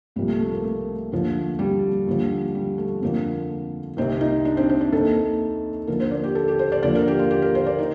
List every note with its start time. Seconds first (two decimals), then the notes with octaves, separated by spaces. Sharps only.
0.16 C2 A#2 F3 G3
0.28 A3
0.40 A3
0.52 A#3
0.64 A3
1.12 D#2 D3 F3
1.59 G3
2.07 D#2 D3 F3
2.55 G3
2.78 A3
3.02 F2 D3 F3 A#3
3.97 C2 C3 D#3 C4
4.21 D#4
4.45 D4
4.57 C4
4.69 C4
4.81 D4
4.92 D#2 D#3 A4
5.87 D#2 D3 F3 A#4
6.00 C5
6.11 D5
6.24 G4
6.35 A4
6.48 G4
6.59 C5
6.72 D5
6.83 D#2 D3 F3 D5
6.95 A#4
7.08 G4
7.19 F4
7.31 G4
7.42 A#4
7.55 C5
7.66 D5
7.79 D#4